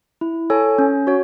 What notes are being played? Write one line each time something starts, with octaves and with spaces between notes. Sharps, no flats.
E4
A4 C#5 G#5
C#4
F#4 C#5